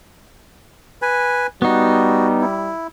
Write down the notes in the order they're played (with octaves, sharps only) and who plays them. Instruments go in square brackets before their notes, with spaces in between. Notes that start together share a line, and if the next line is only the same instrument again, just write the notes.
[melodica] B4 G#5
[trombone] G3 [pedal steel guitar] B3 D#4 [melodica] F#4
[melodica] E4